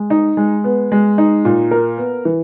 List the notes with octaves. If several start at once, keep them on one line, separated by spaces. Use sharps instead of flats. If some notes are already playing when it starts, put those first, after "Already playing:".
Already playing: G#3
D#4
G#3
B3
G#3
D#4
A#2
A#4
B3
E3